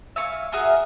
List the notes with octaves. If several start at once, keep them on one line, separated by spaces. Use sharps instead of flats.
E5 F5 G#5 C#6
F#4 G#4 A#4 E5